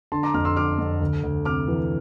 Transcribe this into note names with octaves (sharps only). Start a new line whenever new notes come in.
D3 A5 C6
A#5 D6
F2 D6 F6
C6 E6
D3 D6 F6
F2
D2
D2
C3 D6 F6
E3